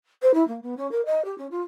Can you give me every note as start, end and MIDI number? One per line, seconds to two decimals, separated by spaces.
0.22 0.32 72
0.34 0.46 64
0.48 0.60 58
0.63 0.75 59
0.77 0.90 61
0.91 1.04 70
1.06 1.24 75
1.25 1.37 67
1.38 1.47 61
1.51 1.61 65